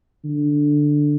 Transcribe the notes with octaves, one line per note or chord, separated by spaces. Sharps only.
D3